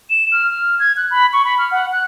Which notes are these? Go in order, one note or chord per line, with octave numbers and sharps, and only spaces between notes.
E7
F6
F6
G#6
F#6
B5
C#6
B5
F6
F#5
F#6